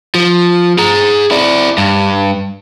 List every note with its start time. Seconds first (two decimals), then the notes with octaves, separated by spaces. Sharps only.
0.15 F3
0.79 G#4 A#5
1.31 E4 D5
1.78 G2